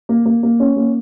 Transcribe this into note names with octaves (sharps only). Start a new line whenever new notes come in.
A#3
A#3
A#3
C#4
A#3